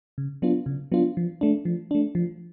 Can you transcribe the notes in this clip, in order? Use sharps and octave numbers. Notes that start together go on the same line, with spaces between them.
C#3
F#3 B3 D4 F4
C#3
F#3 B3 D4 F4
F3
A3 D4
F3
A3 D4
F3